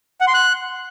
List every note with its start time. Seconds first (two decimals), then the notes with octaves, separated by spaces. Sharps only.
0.21 F#5
0.27 C6
0.34 F#6